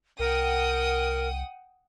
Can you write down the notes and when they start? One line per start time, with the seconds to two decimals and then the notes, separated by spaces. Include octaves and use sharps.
0.19 C2 A#4 F#5 G5 D#6